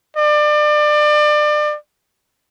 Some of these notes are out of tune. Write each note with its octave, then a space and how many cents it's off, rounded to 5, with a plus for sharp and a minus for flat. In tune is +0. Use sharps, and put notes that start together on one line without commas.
D5 +30